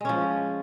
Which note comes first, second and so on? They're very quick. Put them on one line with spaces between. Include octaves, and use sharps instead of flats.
G#3 C#4 F3